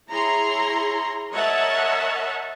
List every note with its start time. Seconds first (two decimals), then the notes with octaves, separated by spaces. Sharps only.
0.10 E4 G#4 C#5 A#5 C6
1.32 A#4 C#5 D#5 E5 F#5 A5